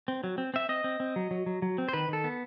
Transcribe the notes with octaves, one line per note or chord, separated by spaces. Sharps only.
C4
F#3
C4
C4 E5
C4 D#5
C4
C4
F#3
F#3
F#3
F#3
C4
C5
D#3 B4
D#3 A4
B3